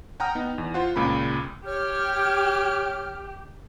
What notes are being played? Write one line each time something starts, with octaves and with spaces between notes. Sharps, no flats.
F#5 G5 A#5 D#6 F6
B3 D#4
E2
F4 C5 F#5
C#2 A#2 C#3 B5
G4 C#5 F6